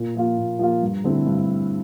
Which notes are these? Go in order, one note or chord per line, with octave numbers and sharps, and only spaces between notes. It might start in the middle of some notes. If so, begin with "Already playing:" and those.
Already playing: A#2
F3 A#3 F4
A#2
F3 A#3 F4
G2
D3 A3 C4 E4
G2